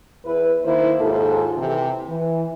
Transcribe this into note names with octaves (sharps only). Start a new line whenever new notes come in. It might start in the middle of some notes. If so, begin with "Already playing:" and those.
E2 E4 B4
D#3 A#3 E4 C5
D#2 G#2 F4 A4
C3 E3
E3